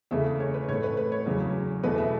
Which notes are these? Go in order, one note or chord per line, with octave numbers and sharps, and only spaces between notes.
E2 C#3 A3 E5
C#5
B4
A2 C#5
A3
B4
B4
C#5
E2 C#3 F#3
E2 B2 A3 B4
E5